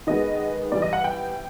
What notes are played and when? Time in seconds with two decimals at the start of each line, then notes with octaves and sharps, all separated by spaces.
0.07 D#3 G#3 B3 D#5
0.72 E3 G3 B3 D5
0.82 D#5
0.93 F#5
1.04 G5